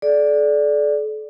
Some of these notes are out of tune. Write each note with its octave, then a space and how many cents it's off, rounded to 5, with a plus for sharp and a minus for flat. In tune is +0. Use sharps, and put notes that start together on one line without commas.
A4 -40 D5 +0